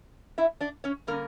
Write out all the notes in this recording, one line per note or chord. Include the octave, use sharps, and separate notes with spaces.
E4 E5
D4 D5
C#4 C#5
D3 G3 A#3 C#4 A#4